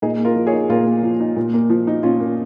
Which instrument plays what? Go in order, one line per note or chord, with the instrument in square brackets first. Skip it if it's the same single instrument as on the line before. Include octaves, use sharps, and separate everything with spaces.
[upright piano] A#2 [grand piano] D#4 G#4
[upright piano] A#3
[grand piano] F4 A#4
[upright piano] F3
[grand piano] G#4 C#5
[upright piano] D#4
[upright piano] A#2 [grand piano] F4 A#4
[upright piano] A#3
F3
D#4
A#2
A#3
F3
D#4
[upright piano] A#2 [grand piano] C#4 F4
[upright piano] A#3